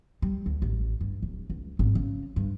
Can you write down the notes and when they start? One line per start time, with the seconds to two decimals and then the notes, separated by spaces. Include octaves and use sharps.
0.22 G3
0.46 D2
0.62 A1
1.01 G2
1.22 D1
1.50 C#2
1.79 G#1
1.95 C#3
2.36 G2